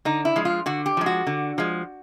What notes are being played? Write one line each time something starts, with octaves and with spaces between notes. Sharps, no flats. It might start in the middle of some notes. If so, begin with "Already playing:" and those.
D3 D#4
E4
F3 G#3
F4
D3 F#4
G4
F3 G#3
F#4
D3
F3 G#3